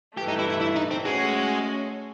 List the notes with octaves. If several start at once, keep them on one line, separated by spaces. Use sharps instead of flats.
G2 E3 A3 G4
D#4
E4
E4
E4
D#4
C4
G#3 A3 C#4 F#4